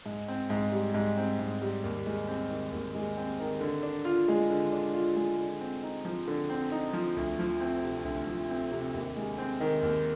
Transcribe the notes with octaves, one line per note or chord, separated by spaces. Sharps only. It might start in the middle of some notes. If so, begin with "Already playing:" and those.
G#2
C4
G#2
G3
G#2
C4
G#2
G3
D#2
G#3
C4
D#3
D#2
G#3
C4
D#3
D3
D4
F4
G#3
D3
D4
F4
G#3
D3
C4
D#4
F3
D3
C4
D#4
F3
D2
F3
C4
C3
D2
F3
C4
C3
D#2
G#3
C4
D#3
D#2